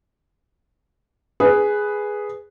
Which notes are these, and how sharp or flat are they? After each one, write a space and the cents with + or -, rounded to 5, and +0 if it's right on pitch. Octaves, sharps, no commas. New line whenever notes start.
G#4 +0 B4 +0